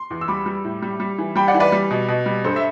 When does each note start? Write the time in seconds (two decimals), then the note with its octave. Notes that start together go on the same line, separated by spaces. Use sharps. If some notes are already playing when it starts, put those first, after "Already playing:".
Already playing: C6
0.10 E2
0.21 E6
0.28 G3 B5 D6
0.46 G3
0.64 A2
0.82 G3
1.00 G3
1.18 E3
1.36 G3 G5 B5
1.48 D5 F#5
1.54 E3
1.60 B4 D5
1.72 G3
1.91 B2
2.08 B2
2.26 G3
2.44 G2 A4 C5
2.56 E5